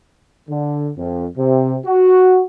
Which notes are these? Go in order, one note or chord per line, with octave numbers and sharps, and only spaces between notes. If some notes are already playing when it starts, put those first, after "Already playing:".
D3
F2
C3
F#4